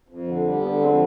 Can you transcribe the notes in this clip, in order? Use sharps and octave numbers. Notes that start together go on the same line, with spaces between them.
F2
D3
G3
D3 B3
F2 G#3 C4